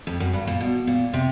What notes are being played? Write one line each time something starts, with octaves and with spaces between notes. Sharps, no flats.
F2
F#2
G2
A#2
B2
A#2
C3